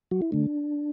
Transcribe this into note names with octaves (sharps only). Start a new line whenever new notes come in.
F#3 F#4
E4
D3 A3 D4